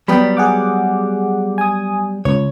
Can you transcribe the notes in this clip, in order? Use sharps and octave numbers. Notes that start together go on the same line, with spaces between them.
F#3 G3 B3 G5 B5
G#4 F#5 D6
G#5 D#6
C#2 C#5